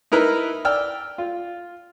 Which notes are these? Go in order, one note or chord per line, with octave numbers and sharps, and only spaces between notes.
D#4 E4 A#4 B4
D5 G5 E6 F6
F4